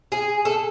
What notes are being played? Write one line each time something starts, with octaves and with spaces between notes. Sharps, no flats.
G#4
A4